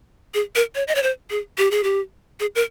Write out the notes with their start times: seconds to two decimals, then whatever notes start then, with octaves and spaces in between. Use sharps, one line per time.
0.34 G#4
0.55 A#4
0.75 C#5
0.88 D#5
0.95 C#5
1.03 C5
1.30 G#4
1.58 G4
1.71 G#4
1.83 G4
2.40 G#4
2.55 A#4